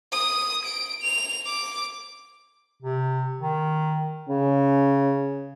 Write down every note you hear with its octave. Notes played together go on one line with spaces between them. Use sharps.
D#6
D7
F7
D6
C3
D#3
C#3 C#4